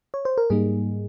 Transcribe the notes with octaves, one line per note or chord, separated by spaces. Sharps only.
C#5
C5
A#4
G#2 G3 A#3 D#4 G#4